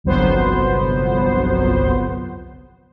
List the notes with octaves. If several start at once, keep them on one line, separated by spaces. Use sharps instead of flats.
G1 C2 F2 F#3 B3 C5